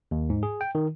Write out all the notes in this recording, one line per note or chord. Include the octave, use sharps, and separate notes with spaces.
D#2
G#2
G#4
G5
D#3